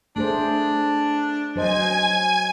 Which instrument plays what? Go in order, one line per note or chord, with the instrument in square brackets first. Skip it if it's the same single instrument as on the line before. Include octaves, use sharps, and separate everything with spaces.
[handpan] A3 G#4 C5 [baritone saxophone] D4
[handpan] F#3 C5 D#5 [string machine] G#5 G#6